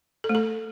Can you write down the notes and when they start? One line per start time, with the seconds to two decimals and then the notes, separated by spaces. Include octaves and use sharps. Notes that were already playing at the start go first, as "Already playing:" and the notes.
0.24 A4
0.29 A3
0.35 A4